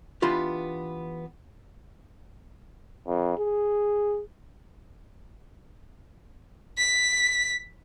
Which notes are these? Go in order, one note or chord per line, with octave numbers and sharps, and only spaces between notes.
E3 B3 D4 F4 G4
F2
G#4
B6